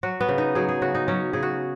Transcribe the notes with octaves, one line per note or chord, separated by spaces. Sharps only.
F#3 F#4
B3
C#3
D#4
F#3 G#4
G#4
C#3 F#4
D#4
F#3 C#4
C#3 G#4
F#4